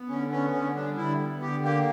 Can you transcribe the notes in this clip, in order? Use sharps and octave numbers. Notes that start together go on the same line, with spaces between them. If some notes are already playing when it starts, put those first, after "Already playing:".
Already playing: B3
D3 C#4
B3 C#4
D3 C#4
G3 D4
D3 E4
B3
D3 G4
A#3 G4